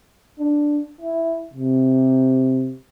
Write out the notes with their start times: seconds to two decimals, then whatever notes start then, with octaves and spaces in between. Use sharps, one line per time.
0.39 D4
1.01 E4
1.54 C3